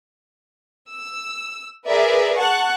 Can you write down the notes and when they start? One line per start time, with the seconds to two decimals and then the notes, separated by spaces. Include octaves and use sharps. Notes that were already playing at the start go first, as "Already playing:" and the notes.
0.89 E6
1.87 G#4 A#4 B4 D5 E5
2.36 F#5 A5 C#6 F#6